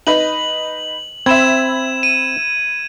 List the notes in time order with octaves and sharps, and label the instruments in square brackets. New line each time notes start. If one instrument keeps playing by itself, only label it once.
[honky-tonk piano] D#4 B4 D#5 [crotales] F#7
[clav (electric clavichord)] C4 [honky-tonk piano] E5 B5 [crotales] G#6 E7
[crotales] D#7